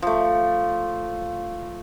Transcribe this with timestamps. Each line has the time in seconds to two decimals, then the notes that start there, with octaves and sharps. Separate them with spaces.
0.02 F3 A3